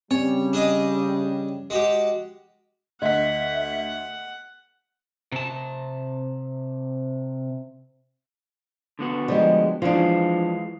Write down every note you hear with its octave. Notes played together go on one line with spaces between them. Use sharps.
C#3 G3 C4 C#5
D4 G#4 D#5
G#3 F#4 G4
D2 D#5 E5 F#5 B6
C3 A5
D3 B3 F#4
F3 G3 G#3
E3 F3 G#3 D4 F4